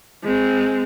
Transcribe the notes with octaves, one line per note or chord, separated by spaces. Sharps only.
G#3 C4